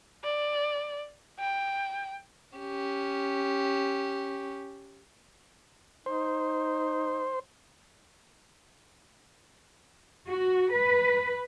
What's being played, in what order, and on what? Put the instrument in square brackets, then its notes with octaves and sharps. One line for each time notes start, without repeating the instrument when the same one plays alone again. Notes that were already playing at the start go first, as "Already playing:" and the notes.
[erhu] D5
G5
[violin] C#4 G4
[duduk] D#4 [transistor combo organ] C5
[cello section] F#4
B4